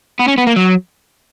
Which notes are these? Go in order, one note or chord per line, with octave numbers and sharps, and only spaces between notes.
B3
C#4
B3
A#3
F#3